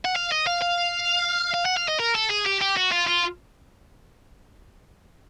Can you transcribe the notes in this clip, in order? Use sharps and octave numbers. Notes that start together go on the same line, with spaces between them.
F#5
F5
D#5
F5
F5
F5
F#5
F5
D#5
A#4
A4
G#4
G4
G4
F#4
F4
F4